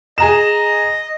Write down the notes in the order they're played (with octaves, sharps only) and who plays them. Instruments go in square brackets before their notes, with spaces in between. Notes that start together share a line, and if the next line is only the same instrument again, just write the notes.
[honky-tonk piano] G#4 A#5 E7 [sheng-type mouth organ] D#5